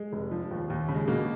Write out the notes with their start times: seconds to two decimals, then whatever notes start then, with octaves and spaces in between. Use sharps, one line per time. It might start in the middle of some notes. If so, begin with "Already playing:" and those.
Already playing: G#3
0.13 F1
0.31 F3
0.51 D#2
0.70 D#2
0.88 C#3
0.95 G#3
1.08 B2 A#3